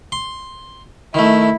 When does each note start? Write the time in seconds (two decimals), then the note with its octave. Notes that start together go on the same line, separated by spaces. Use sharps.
0.12 C6
1.14 D#3 A3 E4